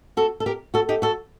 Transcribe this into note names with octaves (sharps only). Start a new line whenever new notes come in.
F#4 A4
A4
G4 A#4
F#4 A4
D#4 G4
F#4 A4